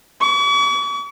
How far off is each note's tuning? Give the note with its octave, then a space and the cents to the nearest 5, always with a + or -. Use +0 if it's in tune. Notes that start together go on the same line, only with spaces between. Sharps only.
C#6 +45